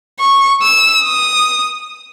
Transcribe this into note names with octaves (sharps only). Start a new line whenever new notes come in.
C#6
E6
D#6